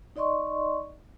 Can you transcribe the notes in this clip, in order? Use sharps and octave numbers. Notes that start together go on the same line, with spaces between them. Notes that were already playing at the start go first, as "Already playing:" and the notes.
D#4 D5 D#5 C6 C#6